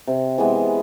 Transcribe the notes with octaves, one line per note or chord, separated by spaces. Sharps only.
C3
E3 G#3 B3